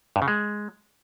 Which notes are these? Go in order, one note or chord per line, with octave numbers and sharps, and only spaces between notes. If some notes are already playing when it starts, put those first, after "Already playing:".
G2
C#3
G#3